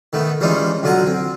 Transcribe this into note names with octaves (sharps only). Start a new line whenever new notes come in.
D#3 A3 B3
E3 G3 G#3 C#4 D#4 F4
B1 D3 F4 F#5 G#5 A#5
C4